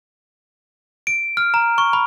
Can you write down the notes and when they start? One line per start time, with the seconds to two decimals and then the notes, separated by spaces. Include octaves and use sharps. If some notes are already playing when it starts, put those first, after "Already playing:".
1.07 D7
1.37 F6
1.54 A#5
1.78 C#6
1.93 B5